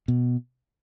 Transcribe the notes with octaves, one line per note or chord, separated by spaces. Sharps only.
B2